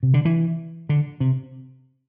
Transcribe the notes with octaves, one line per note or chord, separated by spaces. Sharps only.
C3
D3
E3
D3
C3